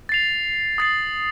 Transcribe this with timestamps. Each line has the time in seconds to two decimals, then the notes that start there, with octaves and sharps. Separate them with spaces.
0.09 A6 C7 F7
0.78 D#6 A6 C7